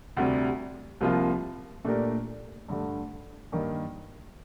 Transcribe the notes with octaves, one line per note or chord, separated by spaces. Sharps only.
D2 C3 G3
C2 C3 F3 A#3 F4
A#2 A3 D4 G4 A#4
G2 D3 A3
G2 D#3 A#3